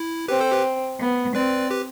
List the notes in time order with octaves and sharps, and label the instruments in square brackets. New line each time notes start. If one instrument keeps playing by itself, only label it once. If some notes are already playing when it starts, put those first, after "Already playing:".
Already playing: [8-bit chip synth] E4
[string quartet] C4 [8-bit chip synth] G4 B4
[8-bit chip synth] A4 C5
G4 B4
[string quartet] B3
[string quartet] C4 [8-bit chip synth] B4 D5
[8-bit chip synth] G4 B4